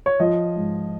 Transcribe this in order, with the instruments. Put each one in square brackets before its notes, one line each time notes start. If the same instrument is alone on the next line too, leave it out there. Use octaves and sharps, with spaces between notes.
[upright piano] C#5
F3 D#5
G#2